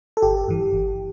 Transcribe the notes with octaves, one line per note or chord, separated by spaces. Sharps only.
A4
G1 G4
G2 E3
G1